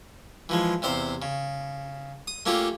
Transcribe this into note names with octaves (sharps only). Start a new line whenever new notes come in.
E3 F3 G#3
E2 C3 C5 F5
C#3
D#6
A3 A#3 C#4 F4 G4 A4